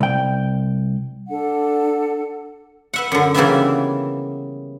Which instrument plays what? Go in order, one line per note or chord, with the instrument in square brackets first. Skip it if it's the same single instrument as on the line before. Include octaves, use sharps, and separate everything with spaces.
[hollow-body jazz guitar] C2 G5
[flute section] D4 A4 F#5
[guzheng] B4 E5 F#5
F#2 D3
C#3 E3 G3 A#3 B3 E5